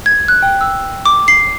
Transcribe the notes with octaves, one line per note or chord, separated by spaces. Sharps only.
G#6
F#6
G5
E6
D6
C7